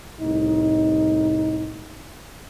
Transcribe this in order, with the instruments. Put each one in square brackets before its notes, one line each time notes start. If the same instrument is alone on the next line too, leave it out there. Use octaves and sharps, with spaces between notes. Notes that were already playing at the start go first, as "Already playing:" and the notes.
[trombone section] C2 A2 D#4